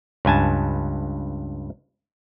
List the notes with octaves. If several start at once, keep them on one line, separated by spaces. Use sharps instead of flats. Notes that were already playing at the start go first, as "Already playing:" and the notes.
C#2 G2 G#5 A5